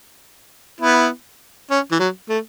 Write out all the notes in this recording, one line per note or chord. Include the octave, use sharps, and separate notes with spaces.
B3 E4
C#4
E3
F#3
A3